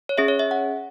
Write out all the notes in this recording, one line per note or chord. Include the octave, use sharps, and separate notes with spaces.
C#5
C#4 G#4 E5
C#5
E5
F#5